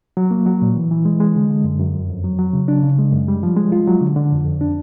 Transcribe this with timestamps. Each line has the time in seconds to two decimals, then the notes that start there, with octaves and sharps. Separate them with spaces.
0.17 F#3
0.31 A#3
0.46 F#3
0.62 A#2
0.76 E3
0.91 E3
1.05 G#3
1.20 G#3
1.36 D3
1.50 D3
1.64 F#2
1.79 F#2
1.94 F2
2.09 F2
2.24 F#3
2.39 F#3
2.53 C#3
2.68 D4
2.83 C#3
2.99 G#3
3.13 F#2
3.28 G3
3.43 F3
3.57 G#3
3.72 F4
3.87 F#3
4.01 D3
4.16 D3
4.32 F2
4.46 F2
4.61 D4